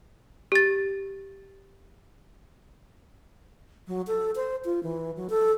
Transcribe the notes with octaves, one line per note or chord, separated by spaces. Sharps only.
G4 A6
F#3
A4
C5
F4
E3
F#3
A4